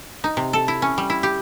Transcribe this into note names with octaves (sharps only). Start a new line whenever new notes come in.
D#4
C3
A4
E4
C#4
G3
E4
G4